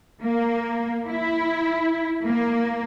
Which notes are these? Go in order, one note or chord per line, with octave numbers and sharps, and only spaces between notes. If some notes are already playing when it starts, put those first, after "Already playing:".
A#3
E4
A#3